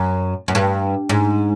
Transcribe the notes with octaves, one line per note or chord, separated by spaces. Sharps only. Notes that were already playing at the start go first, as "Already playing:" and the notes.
Already playing: F#2
F#2
G2
G#2